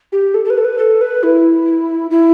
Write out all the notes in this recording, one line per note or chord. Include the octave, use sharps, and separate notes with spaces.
G4
A4
A4
B4
A4
B4
A4
B4
E4
E4